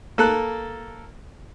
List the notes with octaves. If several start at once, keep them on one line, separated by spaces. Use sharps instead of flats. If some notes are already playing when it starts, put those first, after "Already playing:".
A#3 A4 F#6